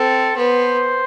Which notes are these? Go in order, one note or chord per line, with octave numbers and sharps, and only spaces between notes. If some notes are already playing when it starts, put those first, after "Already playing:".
Already playing: C4 A4
B3 C5